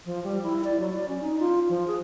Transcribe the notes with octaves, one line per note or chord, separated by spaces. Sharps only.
F3
G3
E4
D5
F#3
D5
C#4
D#4
F4
F3
G#4